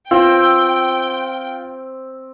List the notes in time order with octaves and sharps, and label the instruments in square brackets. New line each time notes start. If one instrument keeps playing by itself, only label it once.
[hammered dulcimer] C4 [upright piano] F4 [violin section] G5